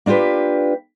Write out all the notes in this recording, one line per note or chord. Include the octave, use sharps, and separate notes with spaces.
A#3 D4 F4 G4 B4